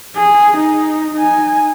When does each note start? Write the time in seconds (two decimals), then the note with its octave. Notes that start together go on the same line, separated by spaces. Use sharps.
0.16 G#4
0.57 D#4
1.14 D#4 G#5